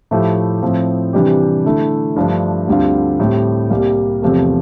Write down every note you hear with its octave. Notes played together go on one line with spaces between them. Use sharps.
A2 F3 A3 E4 G4
A2 F3 C4
C3 E3 G3 D4 G4
D3 A3 E4
G2 F3 A3 D4
D2 D3 G3 C4 F4
A2 G3 C4 G4
C2 C3 G3 A#3
E2 C3 F3 A3